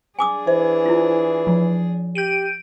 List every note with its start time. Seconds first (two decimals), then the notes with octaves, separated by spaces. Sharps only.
0.19 D4 G#4 G#5 D6 D#6
0.47 E3 C5
0.86 E4 F4
1.47 F3
2.15 G4 G6 D7 D#7